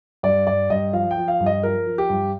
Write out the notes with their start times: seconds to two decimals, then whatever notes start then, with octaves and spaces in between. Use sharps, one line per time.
0.23 G2 D5
0.47 G2 D5
0.70 G2 D#5
0.93 F3 F5
1.11 G5
1.17 F3
1.28 F5
1.40 G2
1.46 D#5
1.63 F3 A#4
1.86 F3
1.98 G4
2.10 G2